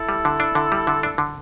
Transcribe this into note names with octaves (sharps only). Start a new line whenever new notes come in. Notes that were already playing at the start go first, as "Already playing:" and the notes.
Already playing: E4 A4
G3
D3
D4
D3
G3
D3
D4
D3